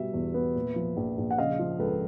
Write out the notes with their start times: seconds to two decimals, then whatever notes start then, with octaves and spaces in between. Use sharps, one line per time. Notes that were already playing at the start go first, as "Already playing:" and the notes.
Already playing: B2 G3 E5
0.14 E2
0.34 B3
0.55 A#2
0.76 F3
0.97 A#1
1.18 A#1
1.31 F#5
1.38 C#3 D#5 F5
1.59 F3
1.79 C#2 A4 B4